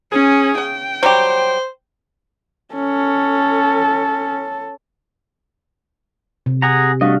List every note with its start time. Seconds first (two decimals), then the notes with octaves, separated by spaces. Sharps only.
0.12 C#4 G#4
0.58 C#3 G5
1.03 F#3 G3 G4 C5
2.75 C#4 A4
6.46 C3
6.62 G#4 F#5 A#5
7.01 G3 A3 D4 F#4 D#5 F5